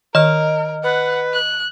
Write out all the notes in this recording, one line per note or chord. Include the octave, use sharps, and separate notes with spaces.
D#3 A#4 D#5 F6
B4 F#5
F#6